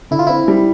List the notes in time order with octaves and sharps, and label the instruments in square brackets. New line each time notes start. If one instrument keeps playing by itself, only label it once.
[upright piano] D3 [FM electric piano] E4
[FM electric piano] F4
[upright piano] C4 [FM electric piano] E4
[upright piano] G3